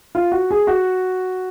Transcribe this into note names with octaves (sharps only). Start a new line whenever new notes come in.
F4
F#4
G#4
F#4